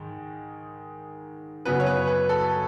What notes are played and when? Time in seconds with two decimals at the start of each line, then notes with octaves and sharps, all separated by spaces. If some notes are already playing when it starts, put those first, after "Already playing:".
Already playing: G#2 D#3 G#3
1.65 F#2 C#3 F#3 B3 B4
1.80 C#5
1.86 B4
2.07 B4
2.29 A4